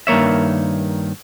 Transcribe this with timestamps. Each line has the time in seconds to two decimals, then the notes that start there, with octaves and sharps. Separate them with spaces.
0.07 G2 D#3 A#3 C#5 E5